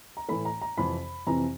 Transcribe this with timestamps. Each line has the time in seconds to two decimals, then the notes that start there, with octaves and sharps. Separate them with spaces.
0.17 A#5
0.29 A2 E3 A3 B5
0.45 A#5
0.62 A#5
0.78 F2 C3 E3 B5
1.27 F2 C3 E3 A#5